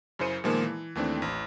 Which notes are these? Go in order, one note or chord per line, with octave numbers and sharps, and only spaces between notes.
F#2 C#3 E4 C5 C#7 D#7
A#2 D#3 F3 G#3 A#3 B3
E3
D#2 E3 A3 C4 D4
A1